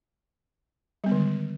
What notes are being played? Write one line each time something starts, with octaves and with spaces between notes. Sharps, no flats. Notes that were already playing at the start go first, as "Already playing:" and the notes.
D3 D#3 G3 G#3 B3